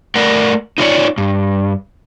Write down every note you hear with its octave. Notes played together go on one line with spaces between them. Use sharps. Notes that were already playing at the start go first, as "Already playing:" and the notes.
A3 A#4 D5 F#5
D#4 F4 C#5 D5
G2